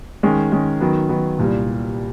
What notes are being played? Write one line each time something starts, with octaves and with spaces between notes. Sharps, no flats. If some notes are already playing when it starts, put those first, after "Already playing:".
D#3 G#3 C#4
D#3 G#3 C#4
D#3 F#3 B3
D#3 F#3 B3
C2 A#2 G3